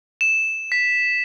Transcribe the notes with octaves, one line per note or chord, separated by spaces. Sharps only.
E7
B6